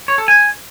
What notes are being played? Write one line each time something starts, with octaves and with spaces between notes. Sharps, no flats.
C#5
A4
G#5